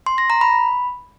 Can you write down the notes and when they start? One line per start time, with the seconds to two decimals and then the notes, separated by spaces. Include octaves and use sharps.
0.06 C6
0.18 A#6
0.30 A#5
0.41 B5